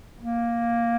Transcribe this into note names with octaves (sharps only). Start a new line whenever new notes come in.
A#3